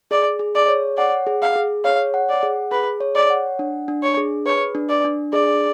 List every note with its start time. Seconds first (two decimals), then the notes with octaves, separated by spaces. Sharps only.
0.11 G#4 D5
0.39 G#4
0.55 D5
0.68 C#5
0.97 D5 F#5
1.27 G#4
1.42 F5
1.56 G#4
1.84 C#5 F5
2.14 F#5
2.29 D5
2.43 G#4
2.72 G#4 B4
3.01 C#5
3.15 D5
3.30 F#5
3.59 D4
3.88 D4
4.03 C#5
4.17 G#4
4.46 B4 C#5
4.75 D4
4.89 D5
5.05 D4
5.32 G#4 D5